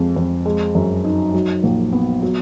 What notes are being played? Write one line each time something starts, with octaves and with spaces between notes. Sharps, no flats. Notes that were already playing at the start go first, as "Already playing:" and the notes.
Already playing: F2 G#3
F2
G#3
F#2
D#4
F#3
A#1
B3
F#3